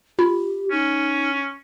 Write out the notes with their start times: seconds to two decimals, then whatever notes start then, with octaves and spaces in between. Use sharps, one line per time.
0.19 F4 G4 B5
0.71 C#4 D#4